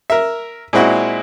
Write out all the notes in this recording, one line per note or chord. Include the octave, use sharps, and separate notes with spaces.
A#4 E5
A#2 G#3 C4 E4 F#4